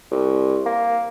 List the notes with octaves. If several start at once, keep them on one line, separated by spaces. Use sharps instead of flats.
C2
A#3